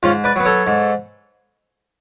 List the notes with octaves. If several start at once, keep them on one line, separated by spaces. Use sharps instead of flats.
G#2 C#4 F4
B4 D5
F#3 B3
A4 C#5
G#2